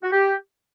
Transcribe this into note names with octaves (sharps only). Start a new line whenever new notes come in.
F#4
G4